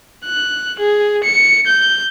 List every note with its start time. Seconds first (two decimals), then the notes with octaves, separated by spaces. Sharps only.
0.24 F#6
0.79 G#4
1.23 C#7
1.67 G6